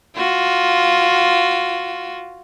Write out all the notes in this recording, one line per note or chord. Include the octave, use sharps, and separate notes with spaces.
F4 F#4